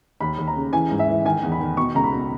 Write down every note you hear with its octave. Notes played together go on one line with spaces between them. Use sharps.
D#2 B5
D#2
A#5
C#3
E3 G#5
G#2
E5
E3
D#3 G#5
E2
B5
D#3
B2 C#6
C#2 A#5
B5
B2